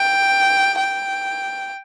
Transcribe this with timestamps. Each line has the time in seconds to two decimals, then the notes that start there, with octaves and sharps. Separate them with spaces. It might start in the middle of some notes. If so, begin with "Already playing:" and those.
Already playing: G5
0.79 G5